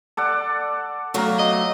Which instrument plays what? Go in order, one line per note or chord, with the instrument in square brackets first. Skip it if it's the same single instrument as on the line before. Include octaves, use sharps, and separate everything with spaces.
[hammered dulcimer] A4 D5 F#5
[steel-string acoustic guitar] F#3 A3 B3 [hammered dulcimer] F#4 F5 A#5
[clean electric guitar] D#5